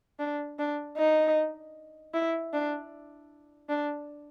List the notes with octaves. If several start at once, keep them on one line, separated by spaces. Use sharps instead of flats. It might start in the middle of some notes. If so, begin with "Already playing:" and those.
D4
D4
D#4
E4
D4
D4